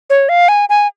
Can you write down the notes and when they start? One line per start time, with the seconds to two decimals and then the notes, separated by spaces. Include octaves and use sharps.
0.10 C#5
0.29 F5
0.48 G#5
0.69 G#5